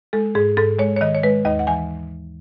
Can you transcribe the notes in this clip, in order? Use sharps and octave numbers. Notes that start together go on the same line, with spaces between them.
G#3 A4
G#2 G#4
G#2 A4
G#3 C#5
C#5
D#3 D#5
C#5
G#3 B4
D#2 D#5
F#5
E3 G#5